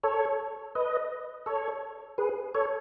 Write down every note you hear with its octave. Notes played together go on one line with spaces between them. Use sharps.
A4 C#5
B4 D#5
A4 C#5
G#4 B4
A4 C#5